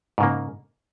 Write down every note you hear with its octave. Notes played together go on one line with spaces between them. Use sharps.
G#2 C#3 A#3